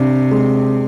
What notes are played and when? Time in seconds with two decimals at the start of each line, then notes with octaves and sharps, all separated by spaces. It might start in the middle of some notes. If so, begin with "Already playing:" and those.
Already playing: C3 D4 G4
0.31 G#3